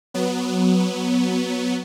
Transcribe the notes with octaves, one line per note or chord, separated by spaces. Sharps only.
F#3 B3